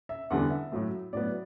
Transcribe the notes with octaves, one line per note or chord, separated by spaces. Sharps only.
E5
E2 D3 G3 B3 F#5
E5
A2 F#3 A3
A2 F#3 B3 D5